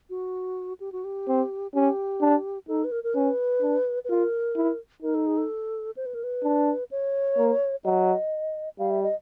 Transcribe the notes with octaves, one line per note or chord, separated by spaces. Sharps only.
F#4
G4
F#4
G4
C4
C#4 G4
D4
D#4 A4
B4
A#4
A#4
C#4 B4
D4
B4
F4 A#4
E4
D#4 A#4
A4
G#4
A4
C5
B4
A#4
B4
D4
C#5
A#3
F#3 D#5
G3 F5
E5
D#5